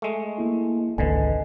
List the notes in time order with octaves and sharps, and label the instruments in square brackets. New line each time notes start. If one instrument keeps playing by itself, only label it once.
[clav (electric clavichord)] G#3 A3
[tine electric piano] A#3 E4
[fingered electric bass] G#1 C#2 [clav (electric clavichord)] D3 [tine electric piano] B4 D#5 G#5